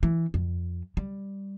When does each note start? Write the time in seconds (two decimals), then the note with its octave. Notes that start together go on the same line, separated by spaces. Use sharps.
0.03 E3
0.34 F2
0.97 G3